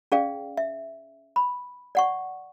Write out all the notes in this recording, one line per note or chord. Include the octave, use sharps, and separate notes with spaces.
C#4 G#4 D5 F5 G5
E5
B5
D5 F#5 C#6